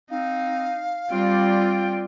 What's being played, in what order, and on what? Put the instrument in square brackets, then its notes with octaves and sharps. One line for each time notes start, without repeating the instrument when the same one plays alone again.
[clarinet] C4 [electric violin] D#4 [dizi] F5
[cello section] G3 D5 [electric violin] C4 F4 [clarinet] G5